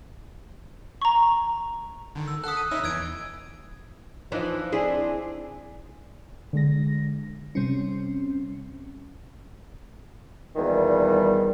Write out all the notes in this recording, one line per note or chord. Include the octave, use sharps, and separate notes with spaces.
A#5 C#6
D3 D#3
E6
A4 F#5 D#6 F#6 B6
D#7
C#4 D#4 E4 E6
E2 E3 E6 G#6 D7
E3 F3 D4 D#4
C4 D4 E4 G#4
D3 G#3 A#6
C3 G3 C4 C#4
E2 A#2 D#3 G3